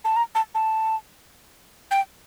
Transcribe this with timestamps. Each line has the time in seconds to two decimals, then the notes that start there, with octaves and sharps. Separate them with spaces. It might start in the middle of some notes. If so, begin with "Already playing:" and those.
0.05 A5
0.16 A#5
0.35 A5
0.55 A5
1.91 G5